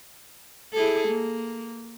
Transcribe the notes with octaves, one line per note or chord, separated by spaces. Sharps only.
E4 G#4 A4
A#3